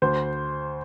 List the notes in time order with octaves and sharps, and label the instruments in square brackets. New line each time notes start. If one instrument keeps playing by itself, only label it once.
[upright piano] D2 C5